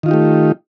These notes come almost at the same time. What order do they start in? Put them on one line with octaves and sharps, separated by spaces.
D#3 F4 D#4 G4 A3